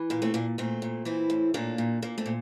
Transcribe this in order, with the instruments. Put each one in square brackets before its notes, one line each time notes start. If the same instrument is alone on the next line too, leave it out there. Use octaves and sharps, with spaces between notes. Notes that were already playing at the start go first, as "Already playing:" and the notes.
Already playing: [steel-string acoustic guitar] E3
A#2 A#3
A3 C4
A#2 A#3 D4
A#2 A3 C4
A#2
E3 C4 E4
A2
A#2 A#3 D4
A#2
A#2 A#3
A3 C4
A#2